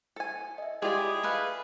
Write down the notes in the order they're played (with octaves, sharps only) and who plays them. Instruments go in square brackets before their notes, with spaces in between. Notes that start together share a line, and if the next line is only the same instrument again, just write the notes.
[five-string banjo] A4 G#5
[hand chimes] D#5 E5
[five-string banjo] G#3 F4 D5 [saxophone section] E4 G#4 [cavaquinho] G4
[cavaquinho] A4 B4 F5